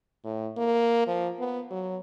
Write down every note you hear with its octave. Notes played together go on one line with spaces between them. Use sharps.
A2
A#3
F3
B3
F#3